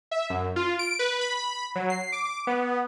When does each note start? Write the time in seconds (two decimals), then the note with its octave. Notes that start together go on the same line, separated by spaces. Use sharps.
0.11 E5
0.30 F#2
0.56 F4
0.79 D7
0.99 B4
1.21 B5
1.75 F#3
1.90 C7
2.12 D6
2.47 B3